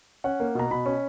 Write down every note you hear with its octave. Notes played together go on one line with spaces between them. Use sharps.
C#4 F#5
A#3
B2 A#5
B2 B5
C#4